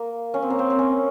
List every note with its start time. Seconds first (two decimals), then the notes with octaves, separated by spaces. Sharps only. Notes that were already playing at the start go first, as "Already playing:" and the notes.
Already playing: A#3
0.34 C#4
0.42 C4
0.50 A#3
0.59 C4
0.70 C4
0.79 C#4